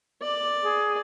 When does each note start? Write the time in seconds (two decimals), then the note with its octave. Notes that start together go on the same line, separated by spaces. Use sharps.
0.22 D5 D6
0.62 G#4